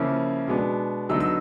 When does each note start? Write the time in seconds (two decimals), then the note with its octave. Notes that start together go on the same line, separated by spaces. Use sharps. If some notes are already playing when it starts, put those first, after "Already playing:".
Already playing: C#3 F3 A#3 C#4 E4
0.48 B2 G#3 B3 D4
1.09 D3 F#3 B3 D#4 E6
1.20 E6